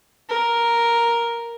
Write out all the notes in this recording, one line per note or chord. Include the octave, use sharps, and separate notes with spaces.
A#4